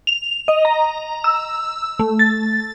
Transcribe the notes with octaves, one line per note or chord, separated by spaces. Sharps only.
F7
D#5
A#5
E6
A3
A6